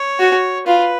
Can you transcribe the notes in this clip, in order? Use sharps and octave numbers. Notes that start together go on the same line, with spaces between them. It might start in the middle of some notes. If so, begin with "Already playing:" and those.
Already playing: C#5
F#4
F4 B4